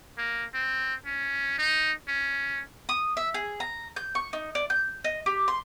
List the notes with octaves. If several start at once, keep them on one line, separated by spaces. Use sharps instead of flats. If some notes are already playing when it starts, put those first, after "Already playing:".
A#3
C4
C#4
D#4
C#4
D#6
E5
G#4
A#5
G6
C#6
D#4
D5
G6
D#5
G4
C6